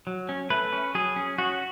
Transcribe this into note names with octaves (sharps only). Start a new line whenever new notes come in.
F#3
C#4
A3 B4
C#4
F#3 G#4
C#4
C#4 F#4